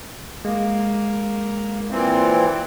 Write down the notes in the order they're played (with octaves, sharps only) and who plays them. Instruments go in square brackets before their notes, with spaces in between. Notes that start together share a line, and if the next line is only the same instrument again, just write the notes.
[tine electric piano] G#3 [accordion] A#3
[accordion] A#2 E3 C4